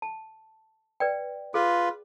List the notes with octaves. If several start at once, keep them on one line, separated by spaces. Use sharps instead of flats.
A5
B4 D5 G5
F4 G#4 B4